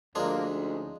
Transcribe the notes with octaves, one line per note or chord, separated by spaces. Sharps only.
D2 F3 G#3 A#3 D4
C#4 D#4